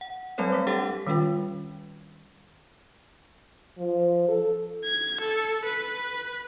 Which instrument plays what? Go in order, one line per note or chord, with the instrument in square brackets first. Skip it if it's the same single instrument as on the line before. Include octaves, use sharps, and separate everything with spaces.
[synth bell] F#5
F#3 G3 A3 C4 A4 C#5
D6 B6
D4 G4 A4 F#5 A6
[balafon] D#3 G3 C#4 F4 B4 G5
[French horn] F3
A4
[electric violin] G#6
A4
B4